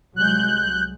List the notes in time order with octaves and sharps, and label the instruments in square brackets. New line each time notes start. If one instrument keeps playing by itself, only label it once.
[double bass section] C2 F#3 G#3 [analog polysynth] F#6 G6